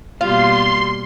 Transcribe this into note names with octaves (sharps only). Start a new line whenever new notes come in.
B2 G3 A#3 F4 C6